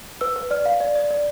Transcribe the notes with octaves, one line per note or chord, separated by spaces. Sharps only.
B4 E6
B4
D5 F6
F5
D5
D5
D5